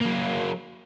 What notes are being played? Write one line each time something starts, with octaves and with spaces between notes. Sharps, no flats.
F#3 A#3